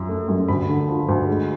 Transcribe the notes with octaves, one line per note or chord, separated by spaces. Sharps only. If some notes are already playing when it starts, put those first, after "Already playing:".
Already playing: F#2 F3
A3
F#2
D2 B5
D3
F3
D2
G#3